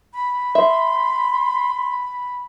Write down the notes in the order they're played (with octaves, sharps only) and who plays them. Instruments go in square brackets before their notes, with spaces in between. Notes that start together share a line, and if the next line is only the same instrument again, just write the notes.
[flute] B5
[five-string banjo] E5 [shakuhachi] C6